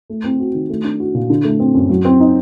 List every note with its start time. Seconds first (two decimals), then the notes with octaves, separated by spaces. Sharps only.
0.10 A3
0.24 C4
0.39 F#4
0.54 D#3
0.70 A3
0.84 D4
1.00 F#4
1.14 A#2
1.30 D3
1.45 A3
1.60 C4
1.75 F#2
1.89 F#3
2.05 C4
2.20 D#4